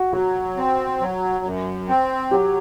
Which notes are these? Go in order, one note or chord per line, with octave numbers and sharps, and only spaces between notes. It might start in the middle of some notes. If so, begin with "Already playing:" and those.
Already playing: F#4
F#3 F#4
C4
F#3
F#2
C4
F#3 G4